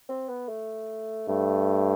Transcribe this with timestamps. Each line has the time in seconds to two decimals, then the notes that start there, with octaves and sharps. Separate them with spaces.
0.09 C4
0.29 B3
0.48 A3
1.28 G2 A3